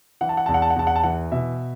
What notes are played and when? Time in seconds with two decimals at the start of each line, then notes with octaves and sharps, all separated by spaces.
0.21 E3 F#5
0.29 A5
0.37 F#5
0.46 E2 A5
0.54 F#5
0.62 A5
0.70 F#5
0.76 E2 A5
0.87 F#5
0.96 A5
1.03 E3 F#5
1.32 B2 E5